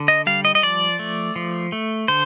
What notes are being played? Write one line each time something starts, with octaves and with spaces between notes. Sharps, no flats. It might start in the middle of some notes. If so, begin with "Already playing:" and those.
Already playing: D3
D#5
G3 F5
D#5
D#5
F3 D5
A3
F3
A3
D3 C5